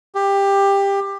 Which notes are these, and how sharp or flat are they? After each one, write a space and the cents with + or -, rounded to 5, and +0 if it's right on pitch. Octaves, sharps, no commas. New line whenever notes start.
G4 +15